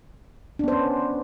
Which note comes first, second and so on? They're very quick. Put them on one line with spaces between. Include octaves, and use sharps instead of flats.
D4 B3 C5 C#4